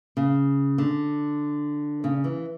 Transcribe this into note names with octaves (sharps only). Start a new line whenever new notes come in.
C#3
D3
C#3
E3